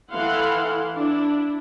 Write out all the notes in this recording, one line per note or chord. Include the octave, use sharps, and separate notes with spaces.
E3 E4 A4 F5 F#5 C6
D4 E4